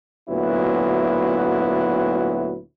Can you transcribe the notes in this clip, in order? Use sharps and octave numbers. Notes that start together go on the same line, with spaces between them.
D2 A#2 F#3 B3 E4